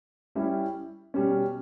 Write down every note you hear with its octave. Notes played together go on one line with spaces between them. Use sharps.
G3 C#4 E4 G4
B2 G3 C#4